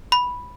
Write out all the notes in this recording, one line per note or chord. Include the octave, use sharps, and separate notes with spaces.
B5